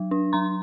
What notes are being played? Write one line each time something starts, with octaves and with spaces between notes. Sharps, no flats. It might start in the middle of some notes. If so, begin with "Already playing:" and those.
Already playing: F#3
D4
F#3 A#5 C6